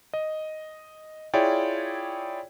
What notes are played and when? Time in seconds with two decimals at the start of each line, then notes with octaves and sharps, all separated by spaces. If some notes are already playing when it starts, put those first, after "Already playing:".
0.13 D#5
1.34 E4 F4 G#4 C#5 D5 G5